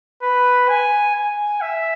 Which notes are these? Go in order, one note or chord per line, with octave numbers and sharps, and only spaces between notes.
B4
G#5
G#5
E5